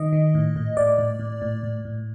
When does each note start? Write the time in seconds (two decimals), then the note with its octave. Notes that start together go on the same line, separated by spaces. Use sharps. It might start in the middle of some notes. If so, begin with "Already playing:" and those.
Already playing: D#3 D#5
0.13 D#3
0.35 A2
0.56 A2
0.77 A2 D5
0.98 A2
1.20 A2
1.42 A2
1.63 A2
1.85 A2